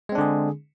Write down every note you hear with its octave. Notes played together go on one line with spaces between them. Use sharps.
D3 G#3 C4 D4 G#4